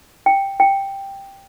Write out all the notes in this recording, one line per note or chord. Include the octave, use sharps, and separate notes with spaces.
G5
G5